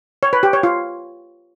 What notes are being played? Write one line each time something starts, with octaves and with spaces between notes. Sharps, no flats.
C#5
B4
G4
C#5
F4